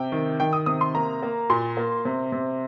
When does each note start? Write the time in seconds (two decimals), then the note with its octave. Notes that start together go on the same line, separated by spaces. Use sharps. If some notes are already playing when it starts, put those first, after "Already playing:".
Already playing: C3 G5
0.12 D#3
0.40 D#3 G5
0.53 D#6
0.66 C3 D#6
0.81 C6
0.95 A#3 A#5
1.22 A#3
1.50 A#2 C6
1.77 A#3
2.05 C3
2.32 C3